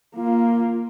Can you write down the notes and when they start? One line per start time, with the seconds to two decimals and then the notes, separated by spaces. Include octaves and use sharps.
0.15 A#3 F4